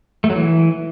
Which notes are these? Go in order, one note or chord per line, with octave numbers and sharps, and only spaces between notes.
A3
F#3
E3